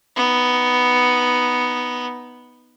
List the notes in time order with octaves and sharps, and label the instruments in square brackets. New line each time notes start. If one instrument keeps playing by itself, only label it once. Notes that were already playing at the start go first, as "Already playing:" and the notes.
[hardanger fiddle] B3 D#4